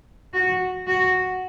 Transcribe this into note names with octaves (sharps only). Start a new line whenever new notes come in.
F#4
F#4